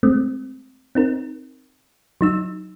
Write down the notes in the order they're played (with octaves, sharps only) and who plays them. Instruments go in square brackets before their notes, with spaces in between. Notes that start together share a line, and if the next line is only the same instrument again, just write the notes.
[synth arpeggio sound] G#3 A3 C4
C4 D#4 A#4
F#3 D#4 E6